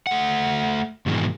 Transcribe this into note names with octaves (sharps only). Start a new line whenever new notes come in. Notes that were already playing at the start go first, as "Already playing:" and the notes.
A3 F#5
G#2 B2 D#3 E3 G#3